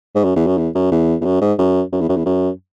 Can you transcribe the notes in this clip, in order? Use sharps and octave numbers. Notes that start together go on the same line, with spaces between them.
G#2
F#2
E2
F#2
E2
F#2
E2
E2
F#2
G#2
F#2
F#2
E2
F#2
E2
F#2